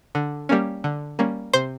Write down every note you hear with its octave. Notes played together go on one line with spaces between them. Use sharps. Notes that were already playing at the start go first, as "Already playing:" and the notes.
D3
G3 A#3 C#4
D3
G3 A#3 C#4
C3 C5